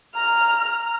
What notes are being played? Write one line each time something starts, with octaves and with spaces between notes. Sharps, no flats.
A#5 F6